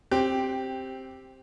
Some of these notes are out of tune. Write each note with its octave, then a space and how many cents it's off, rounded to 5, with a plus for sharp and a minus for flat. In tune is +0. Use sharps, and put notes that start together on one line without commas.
C4 +10 G4 +0